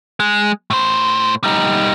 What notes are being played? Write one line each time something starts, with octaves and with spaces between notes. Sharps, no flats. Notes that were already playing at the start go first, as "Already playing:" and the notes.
G#3
A2 C5
G3 D#4